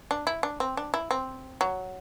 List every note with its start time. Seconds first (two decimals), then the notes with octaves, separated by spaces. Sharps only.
0.11 D4
0.27 E4
0.43 D4
0.60 C4
0.77 D4
0.94 E4
1.11 C4
1.61 F#3